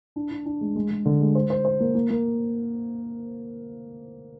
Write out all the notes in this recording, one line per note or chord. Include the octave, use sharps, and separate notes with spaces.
D4
D4
D4
G#3
G#3
G#3
D3
G#3
C5
C5
C5
A#3
A#3
A#3